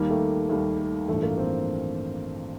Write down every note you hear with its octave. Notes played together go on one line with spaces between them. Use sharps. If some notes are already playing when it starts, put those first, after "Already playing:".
Already playing: D#2 D#3 G3 A#3
A3
D#2 D#3 G3 A3
A3
A1 G2 F3 A3
A#3
A3 C4